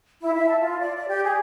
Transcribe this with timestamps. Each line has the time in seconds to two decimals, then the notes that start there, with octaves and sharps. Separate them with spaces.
0.22 E4
0.33 E5
0.47 A5
0.61 F4
0.79 D5
0.96 D5
1.08 G4
1.23 G#4